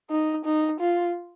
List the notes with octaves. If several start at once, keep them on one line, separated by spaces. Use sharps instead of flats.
D#4
D#4
F4